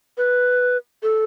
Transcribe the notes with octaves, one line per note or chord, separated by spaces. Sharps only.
B4
A4